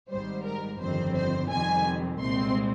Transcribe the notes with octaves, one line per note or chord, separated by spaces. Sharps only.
G#1 G#2 G3 C5
A#4
G1 F2 D#3 G3 C4 C5
C5
F2 C3 D#3 G3 C4 G#5
C2 A#2 G#3 C4 C6